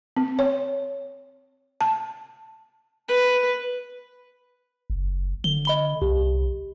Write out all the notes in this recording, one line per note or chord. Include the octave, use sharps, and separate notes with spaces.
C4
C#5
A5
B4
F#1
D3 G7
D#5 B5 G7
C2 G4